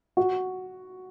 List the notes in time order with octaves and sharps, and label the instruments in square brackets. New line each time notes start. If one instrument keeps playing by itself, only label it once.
[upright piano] F#4